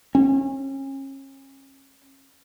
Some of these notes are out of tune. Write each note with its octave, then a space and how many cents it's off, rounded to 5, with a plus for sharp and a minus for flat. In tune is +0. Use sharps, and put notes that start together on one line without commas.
C#4 -35